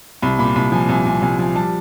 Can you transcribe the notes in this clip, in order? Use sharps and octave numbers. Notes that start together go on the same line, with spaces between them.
C2 B5
A#2 B5
C2 B5
F3 G#5
C2 G#5
C2 G#5
C2 G#5
F3 G#5
G3 A5